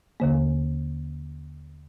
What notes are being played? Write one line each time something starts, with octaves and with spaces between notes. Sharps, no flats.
D#2 D3 A#3